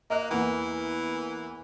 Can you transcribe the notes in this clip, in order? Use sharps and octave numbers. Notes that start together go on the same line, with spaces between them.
A#3 D#5 F#6
E2 E3 A#3 F#5